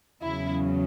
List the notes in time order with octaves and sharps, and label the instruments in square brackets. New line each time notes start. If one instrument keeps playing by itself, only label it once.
[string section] E2 C#3 F#3 E4